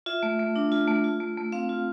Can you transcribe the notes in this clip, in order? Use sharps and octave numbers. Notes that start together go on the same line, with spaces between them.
F4 E5
A3
A3
D4
F4
A3
F4
A3
A3
C4 F5
F4